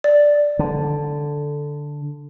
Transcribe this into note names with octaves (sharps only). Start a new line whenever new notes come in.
D5
D3